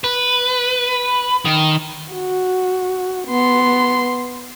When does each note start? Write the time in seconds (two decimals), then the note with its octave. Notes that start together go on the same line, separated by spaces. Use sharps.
0.04 B4
1.45 D#3
2.13 F#4
3.28 B3 C6